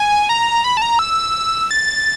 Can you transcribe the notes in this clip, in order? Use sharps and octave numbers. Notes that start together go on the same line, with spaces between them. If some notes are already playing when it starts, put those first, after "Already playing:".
Already playing: G#5
A#5
B5
A5
A#5
E6
A6